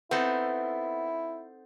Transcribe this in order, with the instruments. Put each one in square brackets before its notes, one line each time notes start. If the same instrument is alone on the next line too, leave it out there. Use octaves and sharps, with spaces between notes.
[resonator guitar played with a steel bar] B3 [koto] C4 D#4 A4 [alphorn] E4